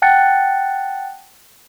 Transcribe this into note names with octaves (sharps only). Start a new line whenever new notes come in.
F#5 G5 A5 F#6 A6 C#7